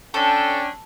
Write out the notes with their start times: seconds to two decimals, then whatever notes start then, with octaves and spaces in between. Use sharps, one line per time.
0.14 C#4 D4 A4 G5